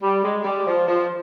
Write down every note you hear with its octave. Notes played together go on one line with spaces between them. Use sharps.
G3
G#3
G3
F3
F3